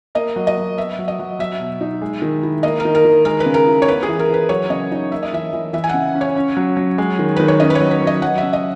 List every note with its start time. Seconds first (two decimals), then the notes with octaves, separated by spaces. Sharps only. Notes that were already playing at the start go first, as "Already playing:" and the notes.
0.15 A#3 D#5
0.36 F#3
0.47 D#5
0.57 F#3
0.77 B3 E5
0.99 F#3
1.08 D#5
1.19 F#3
1.39 F#3 E5
1.60 B2
1.81 D#4
2.01 G#3
2.22 D#3
2.43 E4
2.63 A#3 D#5
2.80 A#4
2.85 D#3
2.95 A#4
3.05 D#3
3.25 G#3 A#4
3.40 B4
3.46 C#3
3.54 A#4
3.67 E4
3.82 C#5
3.88 B3 B4
4.03 G#4
4.09 E3
4.19 A#4
4.29 E3 B4
4.49 F#3 C#5
4.70 C#3 D#5
4.92 D#4
5.12 A#3 E5
5.23 D#5
5.33 E3 E5
5.53 E3
5.73 E3 E5
5.84 G#5
5.89 C#3 F#5
6.15 C#4
6.21 C#5
6.36 C#4
6.57 F#3
6.77 F#3
6.98 G#3
7.19 D#3
7.36 D#3 B4
7.48 C#5
7.60 C#4 D#5
7.70 B4
7.75 C#5
7.80 F#3
7.91 B4
8.02 F#3
8.07 D#5
8.22 F#3 F#5
8.38 E5
8.43 C#3
8.53 D#5